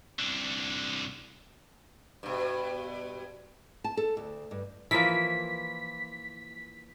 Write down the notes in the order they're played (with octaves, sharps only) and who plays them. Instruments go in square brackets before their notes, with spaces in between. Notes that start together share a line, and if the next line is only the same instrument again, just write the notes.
[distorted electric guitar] C2 D3
[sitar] G2 B2
[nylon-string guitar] A5
A4
D2
G2
[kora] E3 F3 A#3 [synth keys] B6